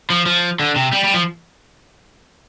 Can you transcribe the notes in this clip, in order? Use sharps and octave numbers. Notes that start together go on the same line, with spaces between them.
F3
F3
D3
C3
G3
G3
F3